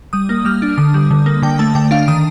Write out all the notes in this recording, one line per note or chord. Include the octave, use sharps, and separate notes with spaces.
G3 D#6
A#3
G3 F6
D4
D3 D#6
G3
D3
A#3
D3 G5
A3 A5
D3 G5
D4 F5
D#3 D#6